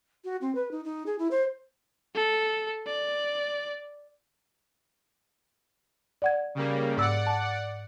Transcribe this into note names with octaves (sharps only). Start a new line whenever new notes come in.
F#4
C4
B4
D#4
D#4
G#4
E4
C5
A4
D5
D5 F#5 G#6
C#3 G3 A#3
G#2 D5 F#5 E6
A5